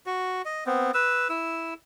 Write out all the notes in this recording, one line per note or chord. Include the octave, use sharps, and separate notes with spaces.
F#4
D#5
B3 C4
B4 E6
E4 E6